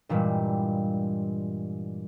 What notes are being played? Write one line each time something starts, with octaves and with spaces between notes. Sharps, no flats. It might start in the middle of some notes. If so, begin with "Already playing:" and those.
G2 A#2 E3 G3 G#3